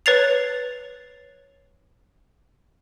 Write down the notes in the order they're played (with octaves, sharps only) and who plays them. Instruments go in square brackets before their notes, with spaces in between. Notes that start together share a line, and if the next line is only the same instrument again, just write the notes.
[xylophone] B4 C#5 A6 C7 F7